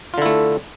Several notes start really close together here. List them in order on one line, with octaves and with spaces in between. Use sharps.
F4 D3 E4 A3